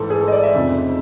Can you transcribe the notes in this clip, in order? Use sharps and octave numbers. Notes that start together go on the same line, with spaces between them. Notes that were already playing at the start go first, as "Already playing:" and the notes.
Already playing: A1 G#2 E3 A4
G#4
A4
D#5
D5
E5
F1 F2 C#3 F3